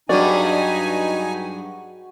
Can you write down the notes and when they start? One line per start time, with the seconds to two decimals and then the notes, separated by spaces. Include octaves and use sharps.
0.09 G2 F#3 G#3 D#4 F#4 D5 G#5